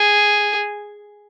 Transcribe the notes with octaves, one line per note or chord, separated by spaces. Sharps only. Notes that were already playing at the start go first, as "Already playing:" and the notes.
Already playing: G#4